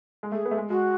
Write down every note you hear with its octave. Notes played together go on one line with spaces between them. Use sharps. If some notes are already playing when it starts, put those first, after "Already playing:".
G#3
A3 G#4
B3
A3
G#3
G#3 F#4